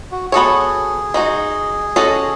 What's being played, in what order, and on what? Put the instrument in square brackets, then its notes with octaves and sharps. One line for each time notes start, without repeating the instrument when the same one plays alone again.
[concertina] F#4
[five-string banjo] B3 F#4 A4 C#5 [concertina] G#4
[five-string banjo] G#3 D#4 F#4
G#3 C#4 F#4 A4 D#5